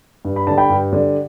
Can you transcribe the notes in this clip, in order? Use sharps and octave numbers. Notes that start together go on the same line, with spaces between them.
G2
B5
D3 G3 A5
G5 B5
G2
D3 G3